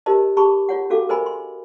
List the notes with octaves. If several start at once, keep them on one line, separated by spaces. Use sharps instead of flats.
F4 G4 A#4 C5 D#5 A5
G4 G#4 A5 B5 C#6
F4 C#5 F#5
C#4 D4 F#4 A4 F5 D6
A#4 C5 D#5 G#5 B5
C6